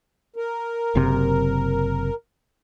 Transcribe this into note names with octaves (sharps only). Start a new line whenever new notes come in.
A#4
F#1 C3